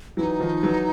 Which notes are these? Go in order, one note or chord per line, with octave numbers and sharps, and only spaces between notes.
E3 F#3 E4
D#4
D#3 F3
E3 F#3